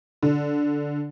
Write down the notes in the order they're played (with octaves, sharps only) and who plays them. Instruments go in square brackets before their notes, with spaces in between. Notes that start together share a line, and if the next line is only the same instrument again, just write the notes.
[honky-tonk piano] D3